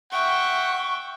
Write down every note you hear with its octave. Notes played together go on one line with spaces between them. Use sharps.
E5 F#5 G5 C#6